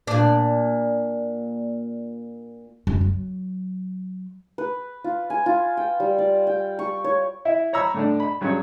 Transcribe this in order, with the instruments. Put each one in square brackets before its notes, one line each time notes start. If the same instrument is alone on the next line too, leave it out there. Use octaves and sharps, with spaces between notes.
[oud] A#2 D4
[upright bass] F#2
F#3
[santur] B4
F4
G#5
F4
G5
G3
D5
G5
C#6
C#5
[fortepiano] E4 E5
C#5 A#5 B5 E6
A2 D3 D4
B5
G2 F#3 C#4 G#4 C#5